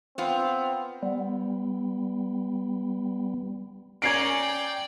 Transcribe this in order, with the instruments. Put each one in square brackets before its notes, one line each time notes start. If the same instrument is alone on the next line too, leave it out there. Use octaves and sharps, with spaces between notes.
[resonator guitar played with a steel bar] B3 F4 [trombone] C4
[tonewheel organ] G3 B3
[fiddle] C#4 A#4 [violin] D5 [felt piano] G#6 C7 D7
[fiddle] G5